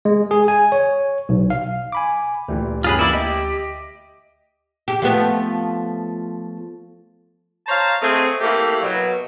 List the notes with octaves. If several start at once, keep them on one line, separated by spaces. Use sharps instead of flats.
G#3
G#4
G#5
C#5
B1
F5
G#5 B5 D6
D2 A#2 E3 G4
G2 C#3 F4 G#4 B4
E3 A#3 E4 D5
G4 D#5 E5
G4
F3 A3 B3
C5 C#5 F5 A5 A#5
A3 C4 G#4 D#5
A3 A#3 E4 G4 F5
B2 F#3